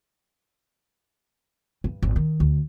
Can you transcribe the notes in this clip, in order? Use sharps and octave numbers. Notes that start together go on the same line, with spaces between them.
G2
G#1
D#3
D2